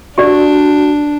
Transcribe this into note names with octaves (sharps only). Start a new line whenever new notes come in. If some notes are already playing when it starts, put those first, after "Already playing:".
D4 F#4 G4 D5